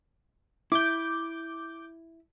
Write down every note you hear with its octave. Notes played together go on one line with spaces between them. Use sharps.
E4 D6 G6